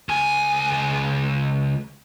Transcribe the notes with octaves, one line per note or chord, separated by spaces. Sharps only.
C#2 G#5